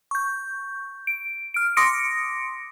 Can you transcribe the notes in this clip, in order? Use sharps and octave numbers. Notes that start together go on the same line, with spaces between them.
C#6 G6
D7
F6 D7
C6 D6 D#6 A#6 C#7 D7